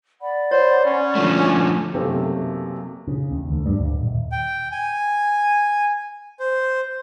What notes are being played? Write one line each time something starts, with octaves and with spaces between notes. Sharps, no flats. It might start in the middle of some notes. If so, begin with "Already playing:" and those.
D5 F#5 B5
C5 C#5
C#4
D3 F3 A3
B1 F#2 C3 A3 A#3
C#3
D#2
D2
G2
D1
D#1
G5
G#5
C5